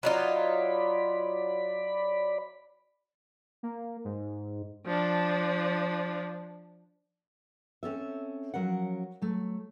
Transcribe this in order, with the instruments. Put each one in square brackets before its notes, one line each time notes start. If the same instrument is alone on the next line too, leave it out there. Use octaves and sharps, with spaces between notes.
[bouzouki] F#3 D#4 F4 [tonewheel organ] D5 B5
[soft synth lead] A#3
G#2
[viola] F3 D4
[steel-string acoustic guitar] C4 C#4 A4 E5
F3 F#3 C#4 A#4 F#5
F#3 A3